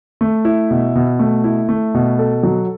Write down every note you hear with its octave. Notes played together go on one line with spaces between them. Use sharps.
A3
E4
B2
B2
A3
E4
A3
B2
A4
F#3